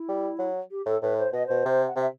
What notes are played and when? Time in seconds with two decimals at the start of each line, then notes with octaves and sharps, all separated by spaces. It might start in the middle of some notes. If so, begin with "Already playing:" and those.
Already playing: E4
0.08 G3
0.39 F#3
0.70 G4
0.86 A2 A4
1.02 A2 B4
1.18 C5
1.32 B2 D#5
1.46 B2 C5
1.65 C3
1.87 F#5
1.96 C3 E5